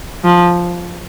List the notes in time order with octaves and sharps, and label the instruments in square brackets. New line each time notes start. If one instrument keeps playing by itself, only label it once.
[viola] F3